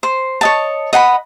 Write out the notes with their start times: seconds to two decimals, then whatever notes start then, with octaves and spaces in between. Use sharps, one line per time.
0.03 C5
0.41 C#5 D#5 A5
0.93 D#5 F#5 G#5 B5